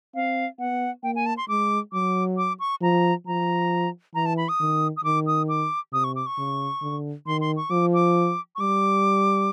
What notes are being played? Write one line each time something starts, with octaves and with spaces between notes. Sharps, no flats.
C4 F5
B3 F#5
A#3 G5
G#5
A5
C6
G#3 D6
F#3 D6
D6
C#6
F3 A#5
F3 A#5
E3 A#5
A5
B5
D#6
D#3
D#6
D#3 D6
D#6
D6
C3 D#6
C#6
D6
C#6
C#3
D3
D#3 C6
C6
C#6
F3 D6
D6
C#6
G3 D6